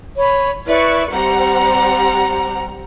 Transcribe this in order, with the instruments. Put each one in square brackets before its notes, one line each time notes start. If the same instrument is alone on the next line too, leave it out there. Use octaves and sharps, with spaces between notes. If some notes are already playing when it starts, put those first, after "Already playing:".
[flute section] C#5 B5
[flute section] E4 [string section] B4 D5 C#6
[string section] G3 C4 F#5 [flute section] A#5